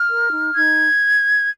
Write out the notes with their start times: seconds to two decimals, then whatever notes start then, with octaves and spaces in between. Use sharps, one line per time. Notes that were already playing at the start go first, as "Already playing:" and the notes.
Already playing: F6
0.09 A#4
0.31 D#4
0.54 D#4 G#6